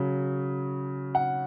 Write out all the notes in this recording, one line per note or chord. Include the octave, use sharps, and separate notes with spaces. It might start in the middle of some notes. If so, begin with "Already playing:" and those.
Already playing: C#3 F#3
F#5